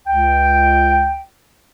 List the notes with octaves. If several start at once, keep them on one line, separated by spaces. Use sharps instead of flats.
C#2 G5